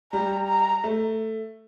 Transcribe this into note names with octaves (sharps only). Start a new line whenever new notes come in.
G3 A#5
A#5
A3